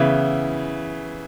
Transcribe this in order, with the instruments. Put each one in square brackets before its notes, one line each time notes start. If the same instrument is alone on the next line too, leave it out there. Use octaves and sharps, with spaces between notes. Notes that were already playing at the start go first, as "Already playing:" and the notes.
Already playing: [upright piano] C#3 E3 B3 E4